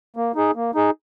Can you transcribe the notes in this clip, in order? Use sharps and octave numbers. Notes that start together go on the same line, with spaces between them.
A#3
D#4 G#4
A#3
D#4 G#4